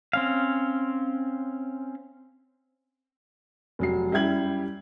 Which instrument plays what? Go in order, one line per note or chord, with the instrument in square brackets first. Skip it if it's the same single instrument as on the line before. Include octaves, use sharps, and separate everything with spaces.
[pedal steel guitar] C4 C#4 F5
[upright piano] F1 F#3 C7
F#2 G3 E4 G4 G#6 F#7